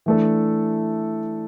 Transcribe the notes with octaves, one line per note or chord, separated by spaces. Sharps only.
E3 A3 D4 A4